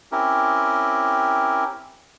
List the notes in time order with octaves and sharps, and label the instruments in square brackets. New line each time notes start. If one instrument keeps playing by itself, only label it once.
[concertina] C4 C#4 E4 G4 A#4